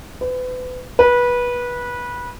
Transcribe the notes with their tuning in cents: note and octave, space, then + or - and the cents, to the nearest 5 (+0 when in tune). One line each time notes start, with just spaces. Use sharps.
B4 +35
B4 -20